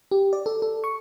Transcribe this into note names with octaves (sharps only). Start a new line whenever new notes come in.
G4
D5
A4
A4
C#6